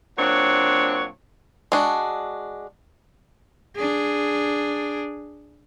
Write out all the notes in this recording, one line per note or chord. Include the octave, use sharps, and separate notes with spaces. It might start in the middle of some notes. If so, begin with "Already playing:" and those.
A#2 F#3 C4 D4 C#5
G#3 D4 F#4
D4 G#4